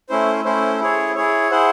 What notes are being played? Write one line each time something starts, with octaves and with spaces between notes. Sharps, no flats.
A3 C#4 E4 C5
A3 C#4 E4 C5
E4 G#4 C#5
E4 G#4 C#5
E4 G#4 C5 F#5